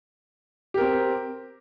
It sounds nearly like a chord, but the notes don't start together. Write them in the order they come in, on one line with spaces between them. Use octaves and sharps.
G4 A#4 C4